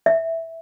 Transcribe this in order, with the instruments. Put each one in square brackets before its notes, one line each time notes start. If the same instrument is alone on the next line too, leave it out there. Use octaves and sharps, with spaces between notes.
[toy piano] E5